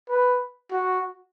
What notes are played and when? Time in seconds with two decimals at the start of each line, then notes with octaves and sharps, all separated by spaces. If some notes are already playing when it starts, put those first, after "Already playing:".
0.09 B4
0.72 F#4